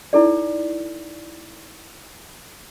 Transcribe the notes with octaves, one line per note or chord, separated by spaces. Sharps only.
D#4 E4 A4 D5